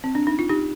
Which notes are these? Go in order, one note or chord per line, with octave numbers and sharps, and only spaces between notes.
C4
D4
D#4
F4
D#4 G4